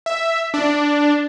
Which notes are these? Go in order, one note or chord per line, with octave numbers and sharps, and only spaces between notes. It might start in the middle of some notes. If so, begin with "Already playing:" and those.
E5
D4